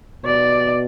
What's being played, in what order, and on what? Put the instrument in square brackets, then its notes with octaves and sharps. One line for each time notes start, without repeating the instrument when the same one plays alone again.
[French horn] B2 [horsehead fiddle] D5